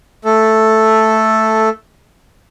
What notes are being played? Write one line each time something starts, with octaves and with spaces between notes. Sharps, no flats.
A3 A4